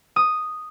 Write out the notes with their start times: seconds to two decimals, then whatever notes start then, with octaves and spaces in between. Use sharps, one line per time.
0.16 D#6